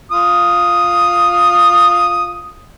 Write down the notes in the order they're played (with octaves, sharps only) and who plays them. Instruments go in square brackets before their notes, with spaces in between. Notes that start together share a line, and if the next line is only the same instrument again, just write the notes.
[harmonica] F4 D#6